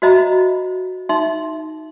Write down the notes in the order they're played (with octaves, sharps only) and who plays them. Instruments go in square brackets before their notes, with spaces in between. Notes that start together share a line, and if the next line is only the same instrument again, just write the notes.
[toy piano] F#4 C5 D#5 E5 A#5 B5
D#4 E5 C6